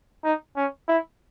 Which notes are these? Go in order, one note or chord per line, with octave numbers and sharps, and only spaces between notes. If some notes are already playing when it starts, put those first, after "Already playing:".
D#4
C#4
E4